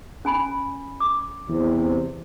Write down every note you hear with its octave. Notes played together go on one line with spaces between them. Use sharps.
C#4 G#5 B5
D6
E2 C3